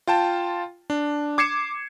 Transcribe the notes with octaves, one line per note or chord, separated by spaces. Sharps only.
F4 G5 A5
D4
D6 G#6 C7 C#7 E7